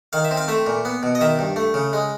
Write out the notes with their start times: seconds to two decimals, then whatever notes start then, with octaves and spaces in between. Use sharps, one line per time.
0.13 D#3 F5
0.24 E5
0.31 C4
0.37 F5
0.48 A3 E5
0.66 A#2
0.85 B3
1.03 B2
1.15 D#5
1.21 D#3 E5
1.39 G2
1.56 A3
1.74 C#3
1.93 G#3